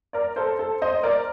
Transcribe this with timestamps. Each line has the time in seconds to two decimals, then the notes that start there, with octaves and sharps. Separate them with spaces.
0.13 A#4 D5
0.36 A4 C5
0.59 A4 C5
0.82 C5 D#5
1.03 A#4 D5